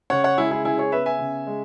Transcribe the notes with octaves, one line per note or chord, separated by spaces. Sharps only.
C#3 C#5 F#5
C#5 F#5
G#3 E4 G#4
E4 G#4
C#3 E4 G#4
G#4 C#5
B3 B4 E5
E5 G#5
C#3
G#3